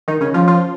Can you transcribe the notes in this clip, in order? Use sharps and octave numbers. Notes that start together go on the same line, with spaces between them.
D#3 D#4
C#3 C#4
F3 F4
F3 F4